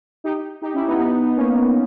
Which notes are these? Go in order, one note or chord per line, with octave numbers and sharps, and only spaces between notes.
D#4 G4
D#4 G4
C#4 E4
B3 D#4
B3 D#4
D#4
A#3 C#4